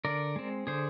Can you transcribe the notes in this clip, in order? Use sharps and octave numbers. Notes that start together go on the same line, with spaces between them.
D3 A#4 D5
G#3 C4
D3 G#4 C5